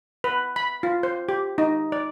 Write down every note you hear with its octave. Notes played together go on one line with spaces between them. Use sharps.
B4
B5
F4
C5
G4
D#4
D5